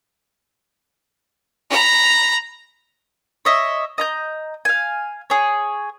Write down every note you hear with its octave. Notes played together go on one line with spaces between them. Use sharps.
A#5 B5
C#5 D#5 E5
D#5 A#5 G6
F5 G#5
G#4 C#5